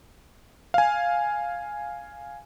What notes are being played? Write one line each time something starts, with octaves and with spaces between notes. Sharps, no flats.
F5 G#5